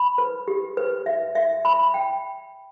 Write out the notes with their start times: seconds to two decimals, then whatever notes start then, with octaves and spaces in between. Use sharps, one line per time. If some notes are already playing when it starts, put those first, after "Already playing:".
Already playing: B5
0.18 B4
0.48 G4
0.77 B4
1.06 E5
1.35 E5
1.65 B5
1.94 G5